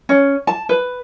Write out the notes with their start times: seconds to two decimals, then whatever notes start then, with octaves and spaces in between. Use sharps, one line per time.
0.09 C#4
0.47 A5
0.69 B4